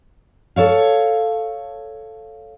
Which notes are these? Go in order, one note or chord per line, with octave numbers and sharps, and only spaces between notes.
A4 C#5 F5